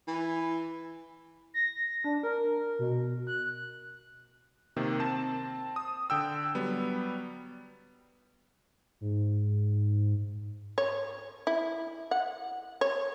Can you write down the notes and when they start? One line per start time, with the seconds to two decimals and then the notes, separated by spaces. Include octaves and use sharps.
0.08 E3
1.54 A#6
2.04 D4
2.23 A#4
2.79 B2
3.27 F#6
4.76 C3 D#3 A#3
5.00 C4 A5 E7
5.76 D#6
6.10 D3 G5 E6
6.55 F#3 G3 B3
9.01 G#2
10.78 C#5
11.47 E4
12.11 F#5
12.81 C#5